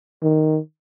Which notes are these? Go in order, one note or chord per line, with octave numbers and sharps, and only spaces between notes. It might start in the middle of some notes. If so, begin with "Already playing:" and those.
D#3